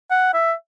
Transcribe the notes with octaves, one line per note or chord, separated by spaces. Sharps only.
F#5
E5